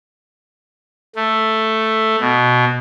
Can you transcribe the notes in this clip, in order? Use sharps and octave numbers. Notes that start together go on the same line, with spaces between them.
A3
B2